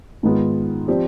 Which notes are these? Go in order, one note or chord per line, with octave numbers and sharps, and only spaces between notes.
G#2 D#3 G#3 B3 F4
F3 C4 G4 D5